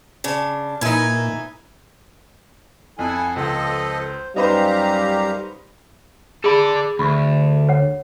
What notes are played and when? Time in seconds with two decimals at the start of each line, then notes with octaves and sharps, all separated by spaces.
0.24 C#3 D4
0.81 A#2 D#4 E4 B4 G#5
2.99 F2 E4 A4 F#5 G#5
3.36 C#2 F3 A4 C5 D#5
4.36 F#2 G3 D#4 G4 B4 C5 F5 A#5
6.44 G#4 A4 D5 B5
6.99 D2 B5 C#6
7.69 C#5 F#5